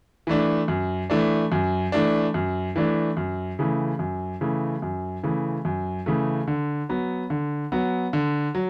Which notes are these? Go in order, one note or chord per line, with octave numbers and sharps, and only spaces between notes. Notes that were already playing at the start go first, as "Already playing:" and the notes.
E3 A3 D4
F#2
E3 A3 D4
F#2
E3 A3 D4
F#2
E3 A3 D4
F#2
C#3 E3 A3
F#2
C#3 E3 A3
F#2
C#3 E3 A3
F#2
C#3 E3 A3
D3
F#3 B3
D3
F#3 B3
D3
F#3